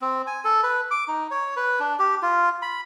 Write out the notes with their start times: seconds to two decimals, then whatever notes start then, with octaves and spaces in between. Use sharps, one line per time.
0.01 C4
0.27 G#5
0.45 A4
0.63 B4
0.91 D6
1.08 D#4
1.31 C#5
1.57 B4
1.80 D4
1.99 G4
2.22 F4
2.62 B5